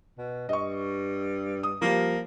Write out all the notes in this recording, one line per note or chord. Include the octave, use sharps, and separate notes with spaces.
B2
G2 D#5 C#6
D#6
F3 G3 A#3